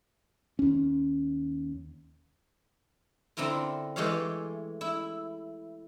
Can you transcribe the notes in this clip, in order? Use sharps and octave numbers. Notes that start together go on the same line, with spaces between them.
D#2 C#4
D3 C4 E4 F4 A#4
E3 G#3 A3 G4 C#5 F5
E4